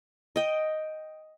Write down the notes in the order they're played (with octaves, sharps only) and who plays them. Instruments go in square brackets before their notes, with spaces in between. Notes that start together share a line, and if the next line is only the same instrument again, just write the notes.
[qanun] D#5 G5